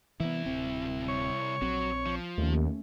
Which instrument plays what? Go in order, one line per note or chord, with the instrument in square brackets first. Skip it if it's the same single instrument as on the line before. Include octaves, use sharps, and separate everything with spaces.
[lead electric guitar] C2 E4 [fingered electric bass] E3 B3
[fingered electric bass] D1 C4
[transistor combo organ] C#5
[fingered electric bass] A#1 C4 [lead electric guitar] F#3
[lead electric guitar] F3
[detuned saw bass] D#2 [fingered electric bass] A3 C#4